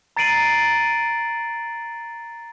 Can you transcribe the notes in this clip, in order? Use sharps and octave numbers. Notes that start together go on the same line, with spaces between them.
A#5 A6 C7 D7 D#7 F#7